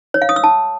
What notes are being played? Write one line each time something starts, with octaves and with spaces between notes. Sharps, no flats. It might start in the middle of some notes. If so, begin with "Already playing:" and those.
C#5
F5
D#6
E6
A5